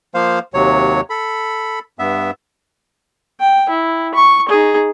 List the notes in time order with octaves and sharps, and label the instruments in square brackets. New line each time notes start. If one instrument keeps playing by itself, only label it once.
[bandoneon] F3 A#3 C5 F5
D#2 C3 F#3 C#5
A4 B5
G2 B3 E5
[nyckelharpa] G5
E4
C#6
D#4 G#4